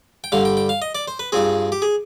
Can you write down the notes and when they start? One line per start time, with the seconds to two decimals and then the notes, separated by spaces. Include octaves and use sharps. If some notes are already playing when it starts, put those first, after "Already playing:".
0.24 G5
0.32 G2 D3 G3 F5
0.45 G5
0.57 G5
0.69 F5
0.82 D#5
0.95 D5
1.08 C5
1.19 B4
1.32 G2 F3 C4 G#4
1.72 G4
1.82 G#4